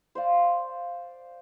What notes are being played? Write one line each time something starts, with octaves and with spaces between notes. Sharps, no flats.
C5 D5 F5